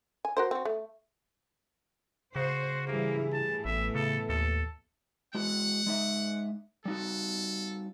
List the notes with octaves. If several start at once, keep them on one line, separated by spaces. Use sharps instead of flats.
G#5
F#4 A#4 C5
C4 F#4
A3
C#3 F#4 C5
G2 E3 A#3 E4 G4 G#4
A2 E3 A5
A1 A3 B3 E5
C#3 A4
D#2 A4
G#3 E4 F#4 F#5
G#3 D#4 E5
G3 D#4 F#4 A4